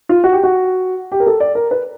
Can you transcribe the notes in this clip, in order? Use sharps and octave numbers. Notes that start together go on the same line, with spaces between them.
F4
F#4
G4
F#4
G4
A#4
A4
D5
A#4
B4